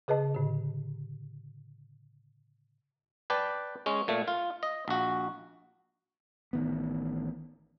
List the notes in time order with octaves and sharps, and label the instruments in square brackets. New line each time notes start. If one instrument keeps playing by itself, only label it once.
[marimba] C#3 G#4 B4 D#5 A5
A2 D3
[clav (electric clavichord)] B4 D5 G5 A5
G#3 C#4
A#2 A3
F4
D#5
A#1 F#4
[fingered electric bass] A1 D#3 B3